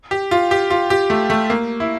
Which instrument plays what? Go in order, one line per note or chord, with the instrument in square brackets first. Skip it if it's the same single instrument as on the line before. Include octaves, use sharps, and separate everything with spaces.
[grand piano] G4
F4
G4
F4
G4
A3
A3
A#3
E4